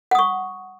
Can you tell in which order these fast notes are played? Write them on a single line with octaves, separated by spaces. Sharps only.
F#5 D#6 C#6